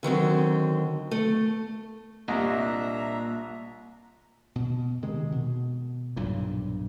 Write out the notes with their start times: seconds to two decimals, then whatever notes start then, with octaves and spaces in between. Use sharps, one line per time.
0.03 D3 D#3 F#3 C4
1.11 A3
2.28 C2 A#2 A#3 D4 D#5 E5 A#5
4.56 B2
5.02 C3 D#3 G#3
5.32 B2
6.16 B1 G2 A#2